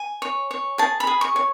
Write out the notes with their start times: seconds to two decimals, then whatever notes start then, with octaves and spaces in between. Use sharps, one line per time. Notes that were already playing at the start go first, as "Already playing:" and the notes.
Already playing: G#5
0.22 C#5
0.51 C#5
0.78 G#4 A5
1.00 B5
1.07 G#4
1.21 C#6
1.36 C#5